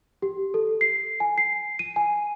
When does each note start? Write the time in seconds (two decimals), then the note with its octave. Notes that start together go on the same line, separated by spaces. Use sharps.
0.22 G4
0.54 A4
0.81 C7
1.20 G#5
1.38 C7
1.79 D#7
1.96 G#5